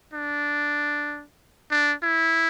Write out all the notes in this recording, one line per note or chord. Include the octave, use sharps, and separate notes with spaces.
D4
D4
E4